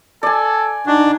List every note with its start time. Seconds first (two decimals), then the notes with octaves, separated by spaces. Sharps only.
0.23 A4 D5 G#5
0.86 D4 D#4 F#4